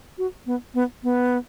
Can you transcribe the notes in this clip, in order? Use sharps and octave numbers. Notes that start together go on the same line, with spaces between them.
F#4
B3
B3
B3